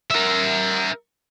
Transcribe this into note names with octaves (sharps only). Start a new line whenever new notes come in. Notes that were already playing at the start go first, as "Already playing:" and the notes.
A#4 E5